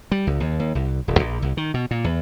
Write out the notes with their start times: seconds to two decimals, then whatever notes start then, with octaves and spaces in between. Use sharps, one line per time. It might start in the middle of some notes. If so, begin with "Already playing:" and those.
0.12 G3
0.27 C#2
0.40 D#2
0.60 D#2
0.75 C2
1.08 D#1
1.19 A#1
1.42 C2
1.57 D#3
1.74 B2
1.91 A#2
2.04 E2